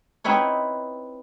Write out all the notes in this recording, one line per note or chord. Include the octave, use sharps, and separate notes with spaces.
C4 D#4 E4 B4 C#5